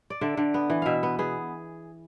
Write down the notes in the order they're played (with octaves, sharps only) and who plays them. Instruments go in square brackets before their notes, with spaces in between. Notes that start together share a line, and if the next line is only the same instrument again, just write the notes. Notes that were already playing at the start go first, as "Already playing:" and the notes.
[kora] D5
D3 E5
D3
B3
E3
B2 E5 F5
B3
B3 G#4